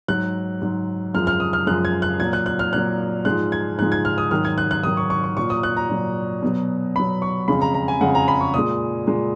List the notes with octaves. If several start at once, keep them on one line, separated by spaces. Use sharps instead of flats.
G#2 F#3 F#6
G#2 F#3
F#2 F3 G#3 F6
F6
D#6
F6
F#2 F3 G#3 F#6
G#6
F#6
A#2 F#3 G#6
F#6
F#6
F6
A#2 F#3 F#6
G#2 F3 G#3 F#6
G#6
G#2 F3 G#3 F#6
G#6
F6
D#6
G#2 D#3 F#3 F6
G#6
F#6
F#6
G#2 D#3 F#3 D#6
C#6
C#6
C#6
A#2 F#3 C#6
D#6
F#6
A#5
A#2 F#3
B2 F#3
B2 F#3 B5
C#6
F2 C#3 G#3 B5
A#5
A#5
G#5
F2 C#3 G#3 F#5
A#5
B5
C#6
A#2 G#3 D#6
A#2 G#3